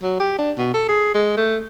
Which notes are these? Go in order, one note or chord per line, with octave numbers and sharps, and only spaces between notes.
F#3
G4
D4
B2
A4
G#4
G#3
A3